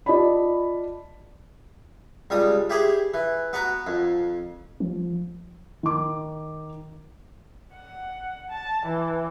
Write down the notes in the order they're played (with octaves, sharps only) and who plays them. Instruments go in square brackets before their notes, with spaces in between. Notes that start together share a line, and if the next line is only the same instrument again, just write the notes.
[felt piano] F4 D5 D#5 A5 B5
[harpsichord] C#2 G3 D#6
E4 G4 G#4 C5
E3
B3 F#4 A#5
F2
[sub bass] F3
[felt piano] D#3 D6
[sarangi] F#5
A5
E3